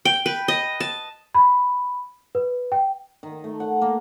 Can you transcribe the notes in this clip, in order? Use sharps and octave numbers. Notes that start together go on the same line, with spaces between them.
G5
B4
D#5
A5
B5
B4
G5
D#3
A3
F#5
A#3